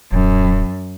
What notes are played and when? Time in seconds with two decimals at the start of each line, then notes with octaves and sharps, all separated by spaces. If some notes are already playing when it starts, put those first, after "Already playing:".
0.12 D#1 F#2